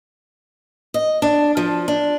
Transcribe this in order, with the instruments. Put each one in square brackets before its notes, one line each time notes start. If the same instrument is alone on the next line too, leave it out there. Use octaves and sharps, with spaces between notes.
[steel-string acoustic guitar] D#5
D4
F3
D4